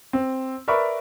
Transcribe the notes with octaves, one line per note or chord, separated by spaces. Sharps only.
C4
A#4 B4 D5 E5 B5 C#6